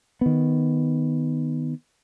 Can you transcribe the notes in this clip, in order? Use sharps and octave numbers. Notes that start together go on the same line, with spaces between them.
D#3 B3